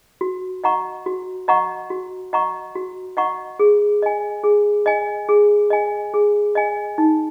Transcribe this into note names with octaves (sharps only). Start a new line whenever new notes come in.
F#4
D#5 F#5 A#5 C#6
F#4
D#5 F#5 A#5 C#6
F#4
D#5 F#5 A#5 C#6
F#4
D#5 F#5 A#5 C#6
G#4
D#5 G#5
G#4
D#5 G#5
G#4
D#5 G#5
G#4
D#5 G#5
D#4